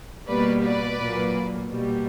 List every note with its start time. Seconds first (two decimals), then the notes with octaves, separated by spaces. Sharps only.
0.28 B2 G3 A#3 B4 D5
0.63 B4 D5
0.98 A#2 F#3 A#3
1.68 B2 G3 A#3